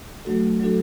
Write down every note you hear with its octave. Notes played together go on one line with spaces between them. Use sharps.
F#3 A3 D4 F#4 A4
F#3 A3 D4 F#4 A4